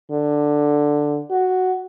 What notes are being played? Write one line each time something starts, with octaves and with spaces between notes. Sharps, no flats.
D3
F#4